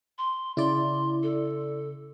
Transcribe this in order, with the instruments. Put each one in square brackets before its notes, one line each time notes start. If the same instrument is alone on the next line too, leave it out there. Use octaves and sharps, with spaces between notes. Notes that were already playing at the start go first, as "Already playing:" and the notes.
[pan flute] C6
[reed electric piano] C#3 [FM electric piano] E4 D5 [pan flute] C6
[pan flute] A4